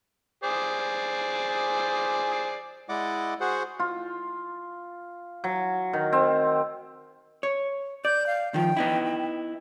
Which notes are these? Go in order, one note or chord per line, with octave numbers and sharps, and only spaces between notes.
G#4 C5 D5
G#3 E4 D5 D#5 F#5 D6
F#4 G#4 C5 F#5
F4
F#3
D#3
C4
C#5
D5 G6
F5
D#3 F3 G5
B3 D#4 E4